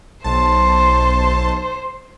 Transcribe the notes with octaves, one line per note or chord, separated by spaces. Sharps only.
B1 C5 A5